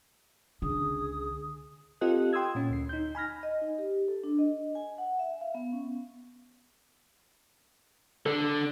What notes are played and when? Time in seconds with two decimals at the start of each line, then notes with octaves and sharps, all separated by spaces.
0.62 C#2 D3 G#4 D#6
2.01 C4 F4 G4 A4 D#5 F#6
2.33 G5 C6 D#6 E6 G#6
2.55 A#2 C#4
2.70 D2 C7
2.89 D#4 G6
3.15 G#5 B5 F6 A#6
3.43 D#5
3.62 D#4
3.78 G4
4.08 A4
4.24 D4
4.39 D#5
4.75 G#5
4.98 F#5
5.19 E5
5.41 F5
5.55 B3
5.73 C#4
8.26 D3 D4 A4